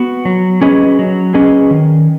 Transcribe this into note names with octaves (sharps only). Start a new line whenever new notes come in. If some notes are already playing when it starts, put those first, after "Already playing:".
Already playing: B3 F#4
F#3
C#4 G#4 B4 D#5
F#3
C#4 G#4 B4 D#5
D#3